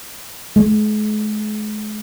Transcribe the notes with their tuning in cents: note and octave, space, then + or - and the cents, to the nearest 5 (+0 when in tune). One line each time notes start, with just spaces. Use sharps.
G#3 +40